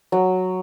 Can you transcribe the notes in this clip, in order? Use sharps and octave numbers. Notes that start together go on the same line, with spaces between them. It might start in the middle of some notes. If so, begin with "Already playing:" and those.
F#3